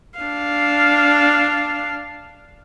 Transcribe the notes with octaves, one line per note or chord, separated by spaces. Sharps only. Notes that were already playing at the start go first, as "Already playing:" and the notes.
D4 F5